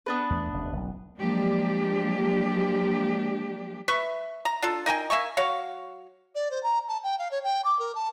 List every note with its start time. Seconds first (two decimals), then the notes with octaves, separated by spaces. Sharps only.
0.06 B3 D4 B4
0.30 E2 A3
0.53 F1 D#2
0.72 F#1 B1
1.17 F3 F#3 G#3 A#3 D4 G4
3.88 B4 E5 C#6
4.45 A#5
4.62 D4 F4 A4
4.86 D#4 A#4 G5 G#5
5.10 A#3 E5 G#5 C#6
5.37 F#3 C#5 F5
6.35 D5
6.51 C5
6.63 A#5
6.88 A5
7.03 G5
7.19 F5
7.31 C#5
7.44 G5
7.64 D6
7.79 A#4
7.95 A5